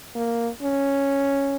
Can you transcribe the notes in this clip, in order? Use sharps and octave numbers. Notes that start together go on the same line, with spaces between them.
A#3
C#4